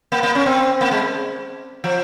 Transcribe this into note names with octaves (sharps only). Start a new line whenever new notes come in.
A#3
A#3
C#4
C4
A#3
G#3
F3